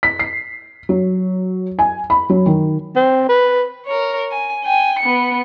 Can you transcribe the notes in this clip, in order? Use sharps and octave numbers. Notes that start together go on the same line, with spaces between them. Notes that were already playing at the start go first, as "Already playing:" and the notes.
B6
C7
F#3
G#5
B5
F#3
D#3
C4
B4
A#4 C#5
G#5
G5 G#5
B3 C#7